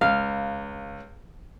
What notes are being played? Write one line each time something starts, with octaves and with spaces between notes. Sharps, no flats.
C#2 F5